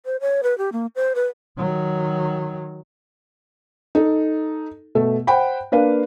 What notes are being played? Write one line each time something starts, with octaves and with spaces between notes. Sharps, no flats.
C5
C#5
B4
G4
A#3
C5
B4
D#3 F#3
D#4 A4
B2 A3
C5 F#5 G5 B5
A#3 D4 B4 F5